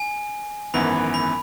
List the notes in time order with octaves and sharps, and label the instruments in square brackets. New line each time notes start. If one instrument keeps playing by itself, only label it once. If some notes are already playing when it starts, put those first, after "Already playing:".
Already playing: [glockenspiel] G#5
[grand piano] G#1 F#2 E3 B3 [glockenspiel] B5
[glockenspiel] B5